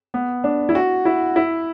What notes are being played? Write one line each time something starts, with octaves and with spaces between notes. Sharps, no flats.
B3
D4
E4
F#4
E4
E4